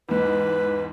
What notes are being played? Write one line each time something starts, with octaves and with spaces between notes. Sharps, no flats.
E2 G#2 B4